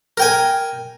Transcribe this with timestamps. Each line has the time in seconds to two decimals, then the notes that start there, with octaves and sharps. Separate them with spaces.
0.17 A#4 G5 G#5